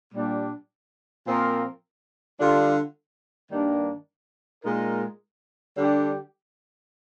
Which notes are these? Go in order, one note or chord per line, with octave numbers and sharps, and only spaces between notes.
A#2 G3 D4
A#2 F3 C4 F4 A#4
D3 G3 D4 F4
G2 D#3 G3 A#3 D4
A#2 G#3 D#4 A#4
D3 G3 D4 G4